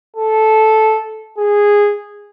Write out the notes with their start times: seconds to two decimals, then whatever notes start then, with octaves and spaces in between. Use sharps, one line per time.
0.16 A4
1.38 G#4